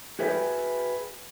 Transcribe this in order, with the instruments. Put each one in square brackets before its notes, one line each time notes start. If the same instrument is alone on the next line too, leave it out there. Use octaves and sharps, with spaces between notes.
[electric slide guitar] F#4 G#4 B4 E5 G5